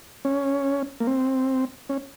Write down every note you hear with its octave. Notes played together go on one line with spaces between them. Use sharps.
C#4
A#3
C4
C#4